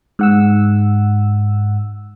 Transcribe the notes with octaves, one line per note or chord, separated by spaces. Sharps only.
G#2 F#5 E6